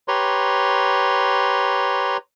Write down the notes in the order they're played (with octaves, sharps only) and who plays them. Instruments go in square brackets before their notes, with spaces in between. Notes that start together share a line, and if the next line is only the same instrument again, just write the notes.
[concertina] G4 B4 C#5 A#5 C6